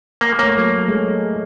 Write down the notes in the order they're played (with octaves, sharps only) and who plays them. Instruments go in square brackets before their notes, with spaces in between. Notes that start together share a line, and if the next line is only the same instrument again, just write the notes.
[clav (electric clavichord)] A#3
[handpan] A3 C#5 [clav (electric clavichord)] A#3
[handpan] F#3 A3 A4
G#3 A3 G#4